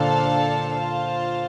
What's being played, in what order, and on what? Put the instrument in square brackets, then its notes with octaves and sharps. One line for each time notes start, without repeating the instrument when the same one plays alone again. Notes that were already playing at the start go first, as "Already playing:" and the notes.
Already playing: [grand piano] A#2 D3 [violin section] D4 A4 C5 F5 A5
[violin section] F4 C5 F5 A5